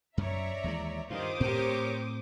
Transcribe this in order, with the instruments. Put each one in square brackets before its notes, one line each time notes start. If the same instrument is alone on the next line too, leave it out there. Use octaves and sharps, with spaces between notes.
[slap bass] F#2 [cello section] C#5 D5 [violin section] E5 A#5
[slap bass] D#2 E3 G#3
[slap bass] G2 [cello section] D#3 F4 [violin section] C5 D6 D#6
[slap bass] A2 C4 [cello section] G4 A#4 C#5